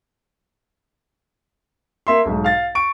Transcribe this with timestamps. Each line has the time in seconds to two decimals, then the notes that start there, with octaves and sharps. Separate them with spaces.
2.07 A#3 E5 C6
2.25 B1 G#2
2.44 F5 A6
2.75 C#6 D7